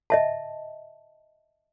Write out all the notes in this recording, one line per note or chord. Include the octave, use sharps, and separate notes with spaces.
D#5 E5 A5